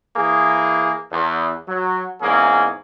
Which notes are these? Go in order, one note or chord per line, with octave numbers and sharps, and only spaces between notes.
E3 A#3 G#4
E2
F#3
E2 G#2 A#3 C#4 G#4